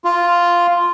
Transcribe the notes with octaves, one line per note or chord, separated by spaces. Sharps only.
F4